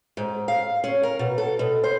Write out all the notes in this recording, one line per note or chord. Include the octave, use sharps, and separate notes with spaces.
G#2
F5
C#4
A#4
B2
A4
B2
C5